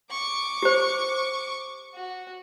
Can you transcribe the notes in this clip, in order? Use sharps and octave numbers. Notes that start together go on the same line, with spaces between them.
C#6 D6
G4 C5
F#4